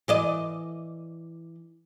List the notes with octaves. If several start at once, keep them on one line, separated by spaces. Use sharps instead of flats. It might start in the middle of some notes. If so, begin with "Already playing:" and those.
E3 D5 D#5